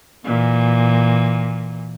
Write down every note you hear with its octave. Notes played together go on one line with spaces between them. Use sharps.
A#2 E3